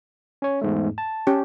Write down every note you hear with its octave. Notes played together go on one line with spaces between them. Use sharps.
C#4 C#5
E2 G#2 A3
A5
C#4 G4